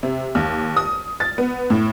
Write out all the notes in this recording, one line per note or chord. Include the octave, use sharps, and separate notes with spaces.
C3
D#2
D#6
A6
B3
A2